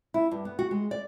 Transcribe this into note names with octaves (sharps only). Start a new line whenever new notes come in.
E4
G2
B3
F#4
G#3
D5